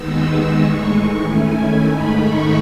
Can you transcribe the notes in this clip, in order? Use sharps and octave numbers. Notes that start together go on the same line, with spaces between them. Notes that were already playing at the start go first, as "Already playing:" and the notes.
Already playing: D#2 D#3 G#3 B3 D#4 E6
E6
A2 E3 G#3 D#4 C#6
D#3 A3 C#4 E4 G#5
G#2 D#3 A3 D#4 B5
C#6